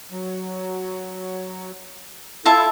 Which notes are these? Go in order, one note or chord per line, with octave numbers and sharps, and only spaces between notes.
F#3
E4 F4 A4 E5 A5